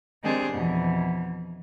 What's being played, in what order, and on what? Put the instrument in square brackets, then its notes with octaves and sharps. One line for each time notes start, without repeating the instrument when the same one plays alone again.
[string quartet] D#3 G#3 C4 D4 G4 G#4
F2 B2 E3